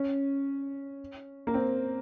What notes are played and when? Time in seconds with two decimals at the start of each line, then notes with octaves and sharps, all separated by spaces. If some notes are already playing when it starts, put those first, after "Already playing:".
Already playing: C#4
1.47 A#3
1.54 C4